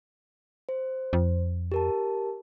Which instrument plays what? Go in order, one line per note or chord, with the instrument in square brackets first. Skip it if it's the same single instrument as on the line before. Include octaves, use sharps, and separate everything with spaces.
[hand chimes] C5
[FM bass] F2
[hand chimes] G4 A#4 A5